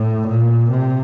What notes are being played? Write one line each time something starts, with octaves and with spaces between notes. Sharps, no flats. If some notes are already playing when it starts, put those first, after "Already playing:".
Already playing: A2
A#2
C3